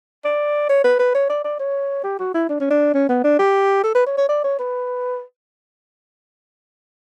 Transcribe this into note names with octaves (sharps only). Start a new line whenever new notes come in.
D5
C#5
B4
B4
C#5
D5
D5
C#5
G4
F#4
E4
D4
C#4
D4
C#4
B3
D4
G4
A4
B4
C#5
C#5
D5
C#5
B4